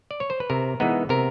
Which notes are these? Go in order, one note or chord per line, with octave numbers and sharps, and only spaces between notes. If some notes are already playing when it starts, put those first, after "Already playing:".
D5
C#5
C5
B4
C3 A#4
E3 G#3 B3 D#4
C3 A#4